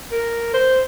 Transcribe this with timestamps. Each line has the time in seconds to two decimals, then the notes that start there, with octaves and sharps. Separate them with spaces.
0.12 A#4
0.54 C5